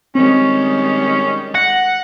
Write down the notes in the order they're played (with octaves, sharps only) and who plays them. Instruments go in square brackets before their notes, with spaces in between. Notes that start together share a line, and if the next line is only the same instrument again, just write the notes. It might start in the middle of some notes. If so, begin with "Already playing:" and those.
[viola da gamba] D#3 G3 G#3 [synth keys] C4 [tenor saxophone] C#4
[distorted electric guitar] F#5 [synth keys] A#6